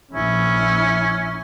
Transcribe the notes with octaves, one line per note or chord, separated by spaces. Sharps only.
A#1 C#4 E4